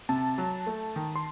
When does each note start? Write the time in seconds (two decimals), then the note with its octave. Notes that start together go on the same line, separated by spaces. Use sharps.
0.09 C3 A5
0.38 F#3
0.67 A3
0.96 D#3
1.16 C6